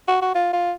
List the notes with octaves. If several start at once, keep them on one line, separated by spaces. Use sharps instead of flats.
F#4
F#4
F4
F4